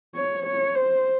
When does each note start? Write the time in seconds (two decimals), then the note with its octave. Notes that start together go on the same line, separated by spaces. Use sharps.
0.16 C#5
0.47 C#5
0.76 C5